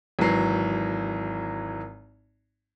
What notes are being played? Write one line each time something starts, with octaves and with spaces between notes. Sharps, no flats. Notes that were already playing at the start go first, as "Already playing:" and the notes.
G#1 E3 F#3 C7